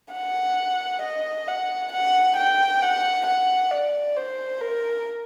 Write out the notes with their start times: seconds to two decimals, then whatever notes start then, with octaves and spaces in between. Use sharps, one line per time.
0.13 F#5
1.02 D#5
1.47 F#5
1.92 F#5
2.36 G5
2.82 F#5
3.26 F#5
3.71 D5
4.16 C5
4.61 A#4